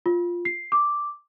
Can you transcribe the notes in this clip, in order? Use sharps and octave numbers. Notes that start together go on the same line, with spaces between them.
F4
C7
D6